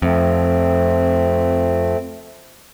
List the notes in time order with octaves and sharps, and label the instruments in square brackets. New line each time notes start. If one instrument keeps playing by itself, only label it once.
[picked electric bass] F2 [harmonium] A3 C4